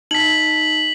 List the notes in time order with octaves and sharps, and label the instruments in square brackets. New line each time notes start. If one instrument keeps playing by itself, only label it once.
[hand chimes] D#4 A5 [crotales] B6 F#7